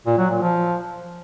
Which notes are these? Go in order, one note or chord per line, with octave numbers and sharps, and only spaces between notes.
A#2
F#3
A#2
F3